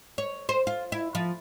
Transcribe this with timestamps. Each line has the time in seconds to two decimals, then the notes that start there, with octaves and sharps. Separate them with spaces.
0.18 C#5
0.49 C5
0.67 F4
0.92 E4
1.15 F3